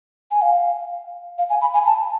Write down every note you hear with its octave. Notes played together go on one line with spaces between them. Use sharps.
G#5
F5
F5
G#5
B5
G#5
A5